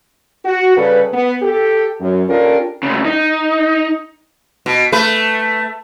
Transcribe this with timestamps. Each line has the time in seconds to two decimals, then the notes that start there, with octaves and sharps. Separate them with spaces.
0.45 F#4
0.77 C#3 G3 A4 B4
1.13 B3
1.42 G4 A4
1.99 F#2
2.28 C#4 D4 F4 G4 A4 A#4
2.83 D2 C#3
3.06 D#4
4.66 B2
4.92 A3 B4